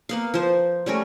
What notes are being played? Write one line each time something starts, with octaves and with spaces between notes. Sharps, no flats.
A#3 B3 F5
F3 C5
G3 A3 C#4 A#4